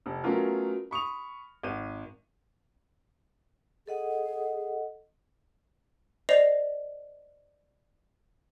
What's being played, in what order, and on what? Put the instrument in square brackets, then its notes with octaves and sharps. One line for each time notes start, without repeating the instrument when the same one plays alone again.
[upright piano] F1
F#3 A3 B3 C#4 F4 A#4
B5 C#6 D#6 F7
G#1 D#7
[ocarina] G#4 [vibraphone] A4 D#5 F#5
[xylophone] C5 D5 D#5 A#6 C7 F7